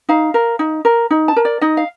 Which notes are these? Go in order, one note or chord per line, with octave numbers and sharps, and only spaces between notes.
D#4 F5
A#4
D#4
A#4
D#4
A5
A#4
D5
D#4 D#5
F5